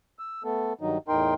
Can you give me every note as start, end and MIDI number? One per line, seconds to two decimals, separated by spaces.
0.19 0.43 88
0.44 0.73 57
0.44 0.73 59
0.44 0.73 69
0.81 0.98 43
0.81 0.98 51
0.81 0.98 54
0.81 0.98 63
1.08 1.34 40
1.08 1.34 45
1.08 1.34 63
1.08 1.34 70
1.08 1.34 79
1.08 1.34 84